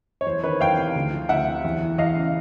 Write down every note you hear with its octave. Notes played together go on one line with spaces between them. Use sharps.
C#5
E2 C5
D#3 B4 C#5
E2 F5 G5
C3
D2
F3
D2 E5 F#5
C3
E2
E3
E2 D#5 F5
C#3